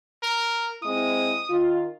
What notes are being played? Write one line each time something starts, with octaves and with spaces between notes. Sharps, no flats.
A#4
G#3 C4 E4 D#6
D#3 F4